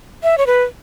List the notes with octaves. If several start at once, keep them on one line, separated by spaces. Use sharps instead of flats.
E5
C#5
B4